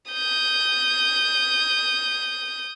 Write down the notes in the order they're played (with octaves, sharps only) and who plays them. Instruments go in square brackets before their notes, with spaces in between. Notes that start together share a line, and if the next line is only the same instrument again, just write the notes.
[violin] D#6 G6